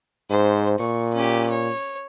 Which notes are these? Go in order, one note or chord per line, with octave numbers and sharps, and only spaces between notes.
G#2 C5
A#2 C#6
C#4 G4
C#5